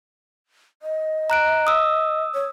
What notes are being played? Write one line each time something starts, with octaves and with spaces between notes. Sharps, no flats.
D#5
A#5 F#6 D7
D#6 E6
C#5